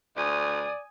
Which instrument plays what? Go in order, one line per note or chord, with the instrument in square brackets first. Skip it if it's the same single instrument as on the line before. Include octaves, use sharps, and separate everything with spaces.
[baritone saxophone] D2 [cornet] D5 [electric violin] G#5 D#6